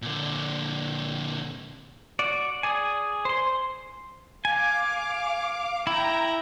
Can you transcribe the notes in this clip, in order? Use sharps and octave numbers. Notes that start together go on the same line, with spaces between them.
A#2 D3
F#4 D5
G#4 D5 G#5
C5 C6
F5 G#5 D6
E4 G5 A#5